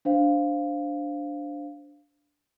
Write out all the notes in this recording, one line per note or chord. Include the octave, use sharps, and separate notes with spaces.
D4 C5 F5